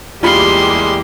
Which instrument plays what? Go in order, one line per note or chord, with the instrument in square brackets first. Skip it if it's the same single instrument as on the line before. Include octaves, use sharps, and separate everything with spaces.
[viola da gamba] E2 A#3 G4 [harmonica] G3 G#3 [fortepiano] F4 B5 [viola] C6